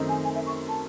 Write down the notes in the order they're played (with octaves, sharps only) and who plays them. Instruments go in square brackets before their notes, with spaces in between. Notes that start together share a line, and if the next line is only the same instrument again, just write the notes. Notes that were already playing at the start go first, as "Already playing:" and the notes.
Already playing: [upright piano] F#2 D#3 A3 C4 D#4
[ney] G#5
G#5
E5
C#6
A5